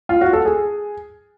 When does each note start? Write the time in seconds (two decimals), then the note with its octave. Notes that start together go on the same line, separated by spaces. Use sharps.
0.09 F4
0.21 F#4
0.33 A4
0.45 G#4